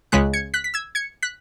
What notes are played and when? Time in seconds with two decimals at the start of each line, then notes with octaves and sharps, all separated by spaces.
0.12 C#2 C#3 G#3 F#6 B6
0.33 G#6 C#7
0.54 F#6 B6
0.64 B6
0.74 E6 G#6
0.95 G#6 C#7
1.23 F#6 B6